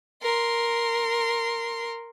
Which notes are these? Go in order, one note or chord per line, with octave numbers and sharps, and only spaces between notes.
A#4 C6